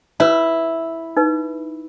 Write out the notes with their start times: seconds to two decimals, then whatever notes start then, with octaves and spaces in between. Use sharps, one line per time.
0.20 E4 B4 C#5 B5
1.17 D#4 B4